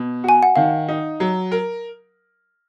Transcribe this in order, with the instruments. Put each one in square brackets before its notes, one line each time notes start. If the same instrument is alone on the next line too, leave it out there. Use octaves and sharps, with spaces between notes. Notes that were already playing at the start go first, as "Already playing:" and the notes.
Already playing: [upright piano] B2
[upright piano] F#4 [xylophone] G#5
[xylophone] F#5
[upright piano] D#3 [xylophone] F5
[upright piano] D#4
F#3
A#4